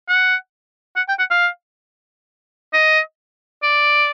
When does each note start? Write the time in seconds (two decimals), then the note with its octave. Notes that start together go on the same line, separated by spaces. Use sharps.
0.09 F#5
0.96 F#5
1.09 G5
1.19 F#5
1.31 F5
2.74 D#5
3.63 D5